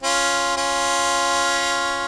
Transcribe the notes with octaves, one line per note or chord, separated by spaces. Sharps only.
C#4 F4
C#4 F4